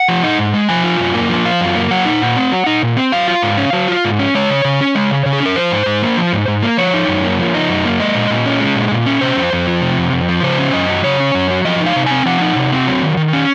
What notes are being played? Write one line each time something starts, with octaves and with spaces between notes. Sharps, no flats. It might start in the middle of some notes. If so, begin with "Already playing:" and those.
Already playing: F#5
F3
D#4
G#2
G#3
F3 G#5
F4
F#2
A#3
F3
F4
F#2
A#3
F#3 F#5
D#4
A#2
C4
F#3
D#4
A#2
C4
F#3 F5
F4
G#2
C#4
F#3
F4
G#2
C#4
G#3 C#5
C#3
C#3
C#4
G#3
C#3
C#3
G#4
C#4
A#4
F3 C5
G#2
G#2
A#3
F3
G#2
G#2
A#3
F3 C#5
D#4
F#2
A#3
F3
D#4
F#2
A#3
G#3 D#5
A#2
A#2
C#4
G#3
A#2
A#2
C#4
C3 C5
F2
F2
F3
C3
F2
F2
F3
C#3 C5
C#4
F#2 D#5
F#3
C#3 C#5
C#4
F#2
F#3
F3 D#5
D#4
F5
C3
C4 G#5
F3 F#5
D#4
C3
C4
F#3
D#3
D#3
C#4